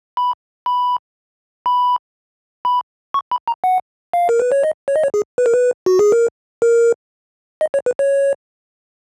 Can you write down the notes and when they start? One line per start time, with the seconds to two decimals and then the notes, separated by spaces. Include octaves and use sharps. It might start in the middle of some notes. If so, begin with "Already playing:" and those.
0.17 B5
0.66 B5
1.66 B5
2.65 B5
3.14 C#6
3.31 B5
3.48 A#5
3.64 F#5
4.13 F5
4.29 A#4
4.40 B4
4.52 C#5
4.63 D#5
4.88 C#5
4.96 D#5
5.03 C#5
5.14 G#4
5.38 B4
5.46 A#4
5.54 B4
5.86 F#4
5.99 G#4
6.12 A#4
6.62 A#4
7.61 D#5
7.74 C#5
7.86 B4
7.99 C#5